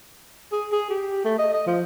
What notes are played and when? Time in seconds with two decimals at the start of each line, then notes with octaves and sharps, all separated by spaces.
0.52 G#4
0.72 G#4
0.90 G4
1.25 A3
1.38 D#5
1.53 D#5
1.66 F3